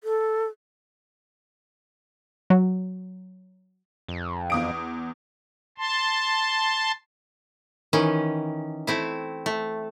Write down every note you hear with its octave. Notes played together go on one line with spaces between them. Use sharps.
A4
F#3
F2
E2 D#6 D7
A5 C6
D#3 E3 C#4
A3 C4 E4
A3